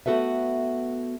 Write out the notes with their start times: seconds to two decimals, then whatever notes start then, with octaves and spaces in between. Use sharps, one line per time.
0.06 A3 B3 F#4 A4 B4 E5